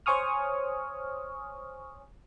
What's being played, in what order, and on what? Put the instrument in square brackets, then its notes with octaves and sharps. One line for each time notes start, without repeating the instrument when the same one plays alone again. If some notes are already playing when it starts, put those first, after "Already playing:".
[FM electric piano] C5 C#5 G#5 C#6 D#6 F6